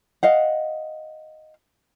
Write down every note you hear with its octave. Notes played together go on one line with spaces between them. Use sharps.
D#5 F5 F#5